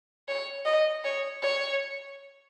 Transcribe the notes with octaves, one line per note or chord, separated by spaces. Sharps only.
C#5
D#5
C#5
C#5